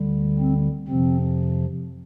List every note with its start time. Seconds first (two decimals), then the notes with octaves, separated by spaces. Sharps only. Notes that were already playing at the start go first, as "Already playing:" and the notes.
Already playing: D2 D3 G3
0.39 C4
0.88 F2 C3 F3 C4